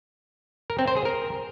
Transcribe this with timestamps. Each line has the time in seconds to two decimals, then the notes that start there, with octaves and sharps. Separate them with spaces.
0.70 A#4
0.79 C4
0.88 C5
0.96 G#4
1.05 A#4